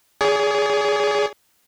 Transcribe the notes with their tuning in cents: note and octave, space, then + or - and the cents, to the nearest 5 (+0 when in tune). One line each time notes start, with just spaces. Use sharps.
G#4 +0 D5 -45